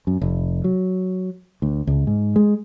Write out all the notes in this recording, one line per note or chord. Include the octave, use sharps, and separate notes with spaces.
F#2
F1
F#3
D2
C#2
G#2
G#3